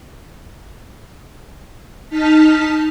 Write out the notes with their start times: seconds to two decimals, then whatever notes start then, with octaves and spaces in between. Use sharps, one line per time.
2.09 D#4 A5 F6 B6